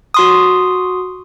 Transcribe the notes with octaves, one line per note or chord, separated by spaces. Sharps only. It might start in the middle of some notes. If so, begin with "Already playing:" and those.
F#4 C6 D#6